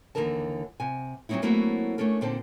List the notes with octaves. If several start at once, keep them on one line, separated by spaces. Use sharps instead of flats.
D#2 D3 E3 D#4 A#4 A5
C3 G#5
F#3 G3 C4 C#4 D#4 E4
F#3 A3 A#3 C4 E4 F#4
A3 C#4 D4 A4 A#4
A#2 D3 C4 D#4 C5 A5